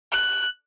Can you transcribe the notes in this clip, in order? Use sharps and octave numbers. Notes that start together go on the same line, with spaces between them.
F#6